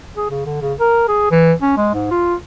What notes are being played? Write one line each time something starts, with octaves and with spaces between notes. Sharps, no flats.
G#4
C#3
D3
C#3
A#4
G#4
E3
C#4
G#3
G#2
F4